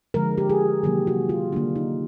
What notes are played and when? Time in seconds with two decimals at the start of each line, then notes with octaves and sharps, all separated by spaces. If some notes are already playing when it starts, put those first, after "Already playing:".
0.14 D3 F3 G#3 A#4
0.38 G4
0.49 G#4
0.83 C3 D#3 F#3 A#3 G4
1.07 F#4
1.29 F4
1.52 D3 G3 A#3 D4
1.76 D#4